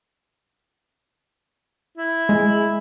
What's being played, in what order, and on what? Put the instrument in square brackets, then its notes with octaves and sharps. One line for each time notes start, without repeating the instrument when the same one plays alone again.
[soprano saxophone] E4
[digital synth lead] G#3